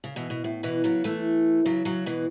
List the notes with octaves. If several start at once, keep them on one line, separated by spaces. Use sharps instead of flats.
C#3
B2 E3
B2
A2
B2 E3
C#3 F#3
E3 A3
C#3 F#3
C#3 F#3
B2 E3